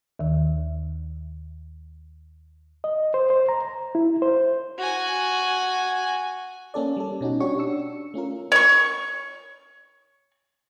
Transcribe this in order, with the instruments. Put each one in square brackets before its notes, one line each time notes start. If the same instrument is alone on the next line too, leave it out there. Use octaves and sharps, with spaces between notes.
[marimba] D#2 D#3
[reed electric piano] D#5
C5
C5
A#5
E4
C5
[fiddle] F#4 G#5
[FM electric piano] A#3 C#4 A4 D5
G3 A4
B2 C#4 D#4 F#4
C#4 D4 F#4 G4 C#5 C#6
D4 E6 C#7
A3 C#4 F4 A#4
[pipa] C#5 C#6